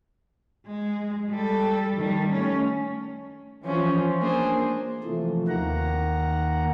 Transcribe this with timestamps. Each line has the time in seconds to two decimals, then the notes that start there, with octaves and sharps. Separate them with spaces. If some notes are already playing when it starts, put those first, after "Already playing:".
0.67 G#3
1.31 G3 A4
1.96 D#3 G3
2.32 A3 C#4
3.64 E3 F3 C#4
4.21 A#3 D4 G#4 C5
5.04 C3 E3 F3 A3
5.48 D#2 D#3 A#3 F#5 A#5